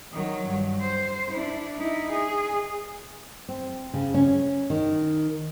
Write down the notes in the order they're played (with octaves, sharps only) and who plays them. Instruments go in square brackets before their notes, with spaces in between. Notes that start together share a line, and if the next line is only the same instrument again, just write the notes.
[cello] D#3 F#3
G2
C5
D4 E4
D#4 E4
G#4
[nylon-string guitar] C4
C#3
C#4
D#3